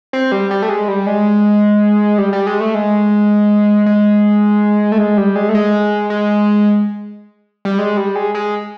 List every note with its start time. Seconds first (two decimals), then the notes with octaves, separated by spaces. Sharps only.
0.13 C4
0.32 G3
0.51 G3
0.62 A3
0.69 G#3
0.88 G3
1.06 G#3
2.18 G3
2.33 G3
2.47 G#3
2.60 A3
2.75 G#3
3.86 G#3
4.92 A3
4.98 G#3
5.17 G3
5.36 G#3
5.49 A3
5.55 G#3
6.10 G#3
7.65 G3
7.79 G#3
7.97 G3
8.15 G#3
8.35 G#3